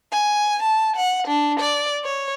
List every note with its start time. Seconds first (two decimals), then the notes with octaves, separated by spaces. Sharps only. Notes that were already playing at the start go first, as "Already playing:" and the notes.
0.13 G#5
0.63 A5
0.96 F#5
1.28 D4
1.60 D5
2.05 C#5